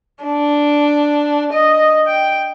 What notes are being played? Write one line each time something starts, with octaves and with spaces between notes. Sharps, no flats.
D4
D#5
G5